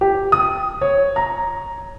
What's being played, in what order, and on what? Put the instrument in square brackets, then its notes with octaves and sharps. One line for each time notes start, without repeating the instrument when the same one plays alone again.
[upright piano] G4
D#6
C#5
A#5